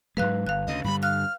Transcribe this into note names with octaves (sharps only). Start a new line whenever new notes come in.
G#2 F#3 G#3 B4 F5 F#6
G1 F5 F#6
D2 C#3 D#5
G2 D3 G3 B5
F5 F6 F#6